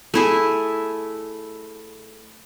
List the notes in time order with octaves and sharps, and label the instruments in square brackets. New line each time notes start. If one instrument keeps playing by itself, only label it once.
[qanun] A3 E4 G#4